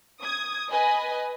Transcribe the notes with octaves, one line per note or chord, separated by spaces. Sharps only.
D#6 G#6
B4 D#5 G#5